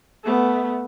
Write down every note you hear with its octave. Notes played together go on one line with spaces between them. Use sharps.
A3 B3